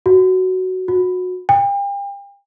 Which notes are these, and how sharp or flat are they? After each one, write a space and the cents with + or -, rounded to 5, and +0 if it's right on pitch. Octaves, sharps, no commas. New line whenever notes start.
F#4 +10
F#4 -25
G5 +40